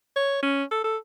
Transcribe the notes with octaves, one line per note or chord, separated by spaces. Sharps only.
C#5
C#4
A4
A4